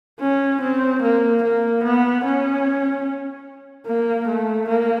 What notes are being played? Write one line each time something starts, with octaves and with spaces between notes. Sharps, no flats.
C#4
C4
A#3
A#3
B3
C#4
A#3
A3
A#3